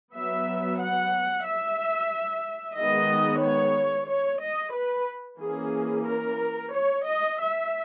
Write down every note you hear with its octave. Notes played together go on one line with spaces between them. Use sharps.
F#3 B3 E5
F#5
E5
D#3 G#3 B3 D#5
C#5
C#5
D#5
B4
E3 A#3 C#4 G#4
A#4
C#5
D#5
E5